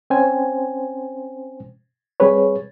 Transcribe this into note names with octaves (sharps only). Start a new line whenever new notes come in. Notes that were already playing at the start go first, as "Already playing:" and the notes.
C4 C#4 C5 G5 G#5
G3 C4 G#4 B4 C#5